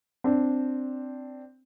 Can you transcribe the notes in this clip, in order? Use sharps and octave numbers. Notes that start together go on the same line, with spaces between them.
C4 D4